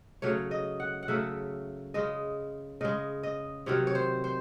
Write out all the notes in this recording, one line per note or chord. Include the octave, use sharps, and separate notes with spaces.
C#3 F#3 A3 C#5
D#5
F#5
F#5
C#3 F#3 A3 E5
C#3 G#3 D#5
C#3 G#3 D#5
D#5
C3 D#3 F#3 C#5
C#5
C5
C5